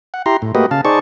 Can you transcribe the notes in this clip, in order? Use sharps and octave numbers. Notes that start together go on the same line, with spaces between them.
F#5
E4 G4 A#5 C6
A2
A3 A#3 F#4 G4 B4 D#5
C#3 F5 A5
D#4 G#4 C5 D5 A5 C#6